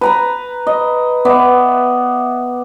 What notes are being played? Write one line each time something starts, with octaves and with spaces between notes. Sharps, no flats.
B4 A#5 B5
D#5
B3 D5 E5